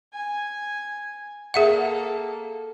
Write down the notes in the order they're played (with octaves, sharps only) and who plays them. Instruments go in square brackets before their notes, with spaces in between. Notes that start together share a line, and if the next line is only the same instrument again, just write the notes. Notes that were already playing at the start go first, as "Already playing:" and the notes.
[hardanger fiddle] G#5
[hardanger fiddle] A#3 A4 [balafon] G#4 E5 F#5